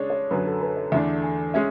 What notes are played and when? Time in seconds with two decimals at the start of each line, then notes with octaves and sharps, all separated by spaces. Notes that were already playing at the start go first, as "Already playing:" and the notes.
Already playing: C#3 G#3 D4 C#5 D5
0.10 C#5
0.31 F#2 D3 F#3 B4
0.46 A4
0.61 B4
0.77 C#5
0.92 E2 D3 A3 D4 E5
1.23 G#5
1.54 G#3 C#4 E5